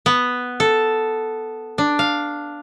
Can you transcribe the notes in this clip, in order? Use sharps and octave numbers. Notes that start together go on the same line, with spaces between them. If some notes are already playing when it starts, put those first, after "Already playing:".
B3
A4
D4
F5